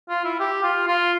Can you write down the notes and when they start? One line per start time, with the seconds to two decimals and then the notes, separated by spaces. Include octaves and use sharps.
0.09 F4
0.25 E4
0.40 G4
0.64 F4
0.88 F4